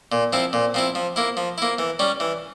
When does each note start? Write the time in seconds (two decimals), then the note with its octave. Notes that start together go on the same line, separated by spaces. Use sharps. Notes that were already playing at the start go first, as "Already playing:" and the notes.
0.12 A#2
0.33 F3 C4 E4
0.53 A#2
0.74 F3 C4 E4
0.95 F3
1.16 A#3 E4
1.37 F3
1.58 A#3 E4
1.78 E3
1.99 G3 C#4
2.20 E3